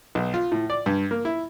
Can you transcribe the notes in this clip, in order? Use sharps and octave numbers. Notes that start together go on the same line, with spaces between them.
B1
F4
A2
D5
G2
A#3
E4